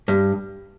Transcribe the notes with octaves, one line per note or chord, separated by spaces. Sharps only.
G2